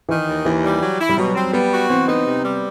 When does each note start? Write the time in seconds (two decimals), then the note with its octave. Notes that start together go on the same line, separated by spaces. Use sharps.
0.09 D#3 E3
0.27 D#2
0.45 D#2 E3
0.63 G3
0.81 F#3
1.00 E4
1.09 G3
1.18 B2 F#3
1.35 C4
1.53 G3 B3
1.71 F#4
1.89 E3 C4
2.07 B3 D#4
2.26 C3
2.44 G3